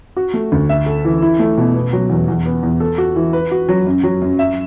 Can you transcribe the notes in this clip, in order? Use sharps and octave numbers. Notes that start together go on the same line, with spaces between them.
F#4
A3
D2
E5
A4
E3
E4
A3
B2
B3
F#3
E2
E2
B3
E2
A4
F#4
E3
B4
F#4
F#3
F#2
F#3
F#2
E5